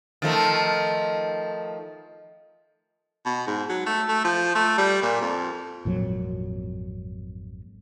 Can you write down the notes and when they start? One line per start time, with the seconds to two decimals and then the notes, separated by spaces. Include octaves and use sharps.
0.22 D#3 F3 A3
3.26 B2
3.47 G#2
3.70 F#3
3.87 A3
4.09 A3
4.25 F3
4.55 A3
4.78 G3
5.02 A#2
5.21 F2
5.85 G#1 F2 A#2 F#3